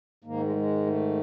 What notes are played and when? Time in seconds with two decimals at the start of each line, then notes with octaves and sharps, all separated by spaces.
0.24 G#2 D#3 A#3
0.41 G#3
0.48 A3
0.56 G#3
0.86 A3